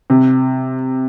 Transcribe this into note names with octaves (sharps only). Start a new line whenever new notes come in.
C3